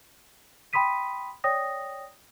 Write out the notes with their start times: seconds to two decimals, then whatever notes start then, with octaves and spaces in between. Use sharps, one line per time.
0.73 G5 B5 C6 D#6 B6 D#7
1.44 C#5 D5 G5 D#6 A#6